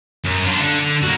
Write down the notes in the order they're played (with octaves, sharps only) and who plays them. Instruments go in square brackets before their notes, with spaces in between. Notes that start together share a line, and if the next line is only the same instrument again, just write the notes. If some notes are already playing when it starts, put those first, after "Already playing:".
[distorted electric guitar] F#2
D4 F4
D3
D3
A#3 F#4